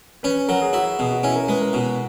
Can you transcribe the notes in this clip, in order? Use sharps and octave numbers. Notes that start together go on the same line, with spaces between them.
C#4 B4
F#3 A#4
G#4
E4 F#4
B2 G#4
F#4
C#4 E4
A#4
G#3 B4
A#4
B2 F#4